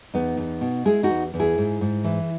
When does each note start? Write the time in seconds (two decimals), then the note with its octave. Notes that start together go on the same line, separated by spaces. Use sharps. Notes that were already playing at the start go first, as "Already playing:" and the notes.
0.14 E2 B3 D#4
0.37 E2
0.61 B2
0.85 G#3 E4 G#4
1.03 D#4 F#4
1.09 E2
1.34 E2
1.40 E4 G#4
1.58 G#2
1.81 G#2
2.04 E3